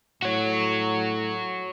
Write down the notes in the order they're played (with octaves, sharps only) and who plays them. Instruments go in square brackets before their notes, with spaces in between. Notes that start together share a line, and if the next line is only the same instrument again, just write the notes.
[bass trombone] A2 [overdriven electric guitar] F#4 C#5